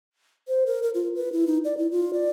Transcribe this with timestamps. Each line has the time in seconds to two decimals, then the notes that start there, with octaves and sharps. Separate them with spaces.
0.48 C5
0.66 A#4
0.83 A#4
0.94 F4
1.16 B4
1.33 E4
1.47 D#4
1.65 D5
1.78 E4
1.91 F4
2.14 D5